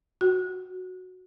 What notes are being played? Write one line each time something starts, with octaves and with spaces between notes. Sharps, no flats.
F#4